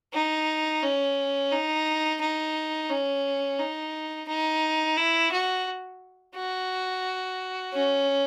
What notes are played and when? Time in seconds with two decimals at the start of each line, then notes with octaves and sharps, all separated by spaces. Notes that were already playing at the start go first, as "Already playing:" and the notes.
0.14 D#4
0.83 C#4
1.52 D#4
2.21 D#4
2.90 C#4
3.59 D#4
4.28 D#4
4.97 E4
5.32 F#4
6.36 F#4
7.74 C#4